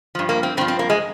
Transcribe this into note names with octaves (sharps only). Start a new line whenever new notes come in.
G2 F3
A#3
C4
G2 F3 C4
C4
A#3
G#3